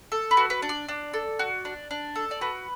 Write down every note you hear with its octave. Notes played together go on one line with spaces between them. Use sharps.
A4
B4
F#4
B4
D4
D5
D4
A4
F#4
D4
D4
A4
D5
F#4 B4